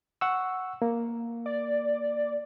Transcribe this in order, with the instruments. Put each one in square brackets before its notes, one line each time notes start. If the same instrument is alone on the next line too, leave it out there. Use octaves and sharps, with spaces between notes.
[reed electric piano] F#5 C#6 E6
A#3
[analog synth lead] D5